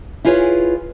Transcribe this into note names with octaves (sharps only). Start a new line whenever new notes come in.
E4 F4 G#4 B4 C#5